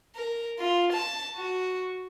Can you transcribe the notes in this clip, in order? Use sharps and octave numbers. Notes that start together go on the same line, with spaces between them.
A#4
F4
A5
F#4